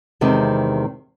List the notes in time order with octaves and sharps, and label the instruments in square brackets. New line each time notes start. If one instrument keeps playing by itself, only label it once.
[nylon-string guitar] E2 C3 D#3 G#3 C4